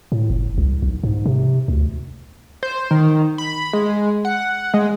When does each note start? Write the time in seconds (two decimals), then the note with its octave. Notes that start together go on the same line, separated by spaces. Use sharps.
0.12 A2
0.30 F#1
0.58 C2
0.82 B1
1.03 G#2
1.26 C3
1.68 D2
2.63 C5
2.91 D#3
3.38 B5
3.73 G#3
4.25 F#5
4.74 G#3